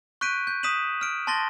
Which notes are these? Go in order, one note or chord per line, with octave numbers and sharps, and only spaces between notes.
C#6 F#6 G6 B6 D7 D#7
G6
D#6 B6 D#7 E7 F#7
F6 D7
A5 C6 A6 A#6 G7